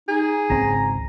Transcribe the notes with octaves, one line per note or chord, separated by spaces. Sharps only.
D#4 G#4
G#1 C#2 C4 A#5